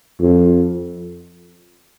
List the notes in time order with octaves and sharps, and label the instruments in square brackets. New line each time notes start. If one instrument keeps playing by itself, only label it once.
[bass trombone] F2